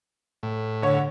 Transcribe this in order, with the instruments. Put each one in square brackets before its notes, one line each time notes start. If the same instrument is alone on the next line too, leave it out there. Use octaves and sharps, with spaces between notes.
[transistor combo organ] A2
[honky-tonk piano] D3 C#5